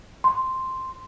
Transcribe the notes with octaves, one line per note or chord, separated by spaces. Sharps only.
C6